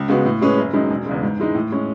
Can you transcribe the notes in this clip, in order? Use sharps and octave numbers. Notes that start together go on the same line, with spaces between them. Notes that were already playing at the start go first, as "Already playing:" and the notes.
Already playing: C#2
C#3 G#3 B3 F#4
A2
G#3 C#4 G#4 B4
F#1
F#2 D#3 G#3 D#4
E1
E2 C#3 G#3
G#2
E3 G#3 D#4
A2
G#3 C#4